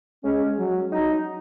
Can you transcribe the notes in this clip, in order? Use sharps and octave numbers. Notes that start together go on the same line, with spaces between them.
G#3 C#4
F#3
F#3 D#4